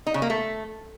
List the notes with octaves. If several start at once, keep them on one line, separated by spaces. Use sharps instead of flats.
D#4
C#3
A#3
A3